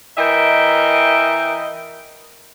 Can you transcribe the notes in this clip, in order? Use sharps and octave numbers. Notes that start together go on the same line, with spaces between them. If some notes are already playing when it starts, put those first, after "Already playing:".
E3 A#4 D#5 E5 G5